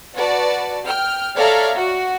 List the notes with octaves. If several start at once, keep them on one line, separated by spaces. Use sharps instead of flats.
F#4 B4 D5 A5
G5 F6
A4 C#5 D5 E5 F5 A#5
F#4